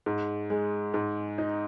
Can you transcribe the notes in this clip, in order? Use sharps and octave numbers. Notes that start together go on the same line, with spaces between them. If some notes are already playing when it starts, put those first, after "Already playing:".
G#2
G#3
G#2
D#4